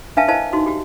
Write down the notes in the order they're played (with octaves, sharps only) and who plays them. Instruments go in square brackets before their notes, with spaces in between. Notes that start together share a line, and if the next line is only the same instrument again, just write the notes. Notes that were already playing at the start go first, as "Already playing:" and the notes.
[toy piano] D4 B4 E5 F5 G#5 A5
E4 A#4 C5 D#5 F5 A5
D#4 F#4 C6
F#4 G4